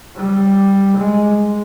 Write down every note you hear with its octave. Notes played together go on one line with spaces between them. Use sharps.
G3
G#3